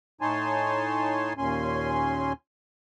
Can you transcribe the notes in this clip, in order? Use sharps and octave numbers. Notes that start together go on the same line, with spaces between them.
A2 D#4 C#5 G#5 A5 C6
D#2 A#2 C#4 G#5 C6